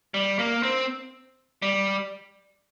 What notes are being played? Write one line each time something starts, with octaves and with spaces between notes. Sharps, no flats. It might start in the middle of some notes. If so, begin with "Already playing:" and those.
G3
A#3
C4
G3